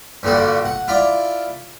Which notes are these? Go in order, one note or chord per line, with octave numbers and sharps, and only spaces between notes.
G2 A#2 D3 G3 F#4
F#5
E4 F4 D5